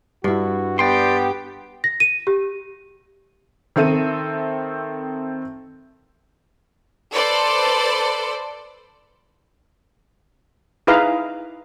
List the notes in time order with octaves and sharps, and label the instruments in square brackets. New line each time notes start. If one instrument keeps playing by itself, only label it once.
[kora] G2 E4 [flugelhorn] F#4
[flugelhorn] B3 [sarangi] G4 [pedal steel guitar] D5 G5 C6
[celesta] A#6
D#7
G4
[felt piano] D#3 C4 A4 E5 D#7
[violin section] A4 B4 C5 D5
[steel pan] D#4 E4 G#4 B4 F5 A#5